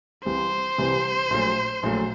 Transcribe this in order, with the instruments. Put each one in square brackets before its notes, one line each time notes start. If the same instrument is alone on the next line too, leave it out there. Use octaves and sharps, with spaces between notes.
[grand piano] C2 C3 E3 G3 C4 [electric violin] C5
[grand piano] C2 C3 E3 G3 C4
A#1 A#2 F#3 A3
A#1 A#2 F#3 A3